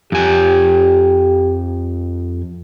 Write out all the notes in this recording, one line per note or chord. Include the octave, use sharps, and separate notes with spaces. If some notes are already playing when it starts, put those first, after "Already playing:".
F2 G4 G#5